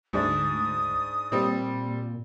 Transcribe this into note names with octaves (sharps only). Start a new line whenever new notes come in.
D2 G#2 G#3 D4 D#6
A#2 G3 C4